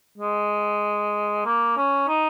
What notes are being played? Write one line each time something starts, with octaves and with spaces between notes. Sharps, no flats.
G#3
A#3
C#4
D#4